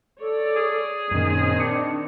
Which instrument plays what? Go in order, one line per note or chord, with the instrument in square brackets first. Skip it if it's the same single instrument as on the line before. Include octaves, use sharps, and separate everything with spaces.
[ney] A4 [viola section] C#5 D5
[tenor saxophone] G#4
[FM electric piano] F#2 A#2 [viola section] D#3 C4 [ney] C#4
[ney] D4 [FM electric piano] D#6 C#7